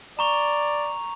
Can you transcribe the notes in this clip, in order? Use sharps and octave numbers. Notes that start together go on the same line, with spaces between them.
D5 A#5 C#6 F7